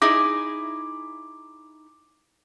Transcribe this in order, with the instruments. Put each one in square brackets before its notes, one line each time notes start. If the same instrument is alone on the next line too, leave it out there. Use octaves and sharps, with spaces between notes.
[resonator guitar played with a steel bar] D#4 E4 G#4 [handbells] D6